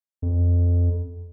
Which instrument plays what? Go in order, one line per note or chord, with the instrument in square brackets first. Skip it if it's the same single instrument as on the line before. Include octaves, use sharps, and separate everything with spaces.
[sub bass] F2